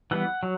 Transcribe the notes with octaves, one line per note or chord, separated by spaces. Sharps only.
E3 G3 B3 F#5
F#3